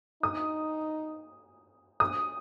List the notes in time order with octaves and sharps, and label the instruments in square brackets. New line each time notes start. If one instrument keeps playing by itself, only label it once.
[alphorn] D#4 [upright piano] D#6
[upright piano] D#6